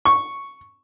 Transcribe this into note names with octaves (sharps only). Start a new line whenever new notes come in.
C#6